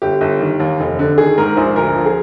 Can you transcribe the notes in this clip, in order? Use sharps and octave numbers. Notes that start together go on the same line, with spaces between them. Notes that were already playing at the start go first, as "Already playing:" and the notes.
G1 G4
G1
D#3
D#2
F1
D3
D#3 G#4
G#2 A#4
A#1 C5
D2 A#4
F3
G#4